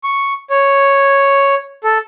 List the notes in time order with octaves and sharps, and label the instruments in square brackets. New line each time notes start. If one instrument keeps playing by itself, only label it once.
[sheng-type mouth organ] C#6
C#5
A4